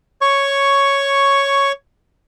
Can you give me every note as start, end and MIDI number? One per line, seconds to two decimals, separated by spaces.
0.21 1.72 73
0.21 1.72 85